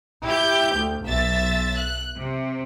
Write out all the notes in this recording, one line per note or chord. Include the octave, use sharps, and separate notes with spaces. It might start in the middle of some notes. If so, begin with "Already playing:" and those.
E4 G4 G6
D2
B1 E5 A6
F#6
C3